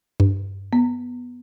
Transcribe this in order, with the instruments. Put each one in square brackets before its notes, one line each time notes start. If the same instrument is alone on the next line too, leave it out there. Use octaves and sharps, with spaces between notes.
[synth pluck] G2
[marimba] B3